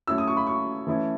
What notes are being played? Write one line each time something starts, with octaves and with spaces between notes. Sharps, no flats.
F#3 A3 C#4 E4 E6
D#6
C#6
B5
C#6
E3 A3 C#4 E4